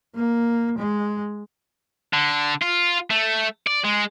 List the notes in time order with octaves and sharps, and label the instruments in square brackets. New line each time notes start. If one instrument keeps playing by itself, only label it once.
[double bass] A#3
G#3
[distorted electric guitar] D3
F4
A3
D5
G#3